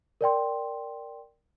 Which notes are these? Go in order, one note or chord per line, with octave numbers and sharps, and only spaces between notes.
A#4 D5 G5 C6